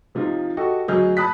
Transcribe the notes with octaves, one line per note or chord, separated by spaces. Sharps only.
C3 F3 D#4 F4
F#4 G4 A4 D#5
D2 F#3 G#4 D#5 F6 G6
A5 B5 D#6 F#6 B6